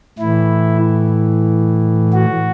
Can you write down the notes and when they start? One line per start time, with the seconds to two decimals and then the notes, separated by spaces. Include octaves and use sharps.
0.19 A2 E3 E4
2.13 F#4